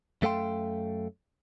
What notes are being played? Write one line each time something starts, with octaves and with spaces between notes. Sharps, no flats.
F#2 A3 A4 F5 G5 C6